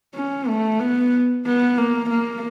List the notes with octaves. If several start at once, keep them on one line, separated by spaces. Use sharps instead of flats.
C#4
A3
B3
B3
A#3
A#3